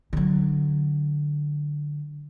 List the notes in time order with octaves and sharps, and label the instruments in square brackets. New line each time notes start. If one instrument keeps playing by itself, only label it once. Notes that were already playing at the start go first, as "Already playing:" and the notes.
[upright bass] D3 F#3